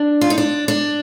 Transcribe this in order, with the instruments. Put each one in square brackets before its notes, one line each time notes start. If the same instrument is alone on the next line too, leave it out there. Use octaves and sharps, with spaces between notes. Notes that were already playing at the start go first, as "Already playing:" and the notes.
Already playing: [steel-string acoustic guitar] D4
F4
D#4
D4
D4